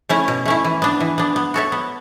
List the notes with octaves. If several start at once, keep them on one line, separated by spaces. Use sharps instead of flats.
A3 C#4 E4
B2
A3 C#4 E4
E3
B3 D4
E3
B3 D4
B3
F#4 A4 C#5 E5
B3